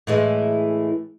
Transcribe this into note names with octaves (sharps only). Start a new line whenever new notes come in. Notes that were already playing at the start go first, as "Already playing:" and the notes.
A2 E3 G#3